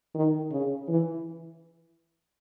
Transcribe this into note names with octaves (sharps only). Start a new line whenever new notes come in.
D#3
C#3
E3